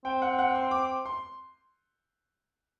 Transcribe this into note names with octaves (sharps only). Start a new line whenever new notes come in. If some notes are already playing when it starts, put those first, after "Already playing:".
C4 G5
F#5
F#5
C6
D6
C6